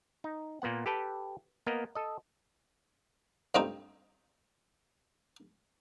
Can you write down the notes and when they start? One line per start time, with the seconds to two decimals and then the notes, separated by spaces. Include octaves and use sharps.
0.24 D#4
0.62 A#2 A#3 B3 F#5
0.86 G4 A4 B4 G5 A5
1.67 A#3 B3 A#4 D#5
1.95 A4 D#5
3.55 G2 A3 C4 D#4 F4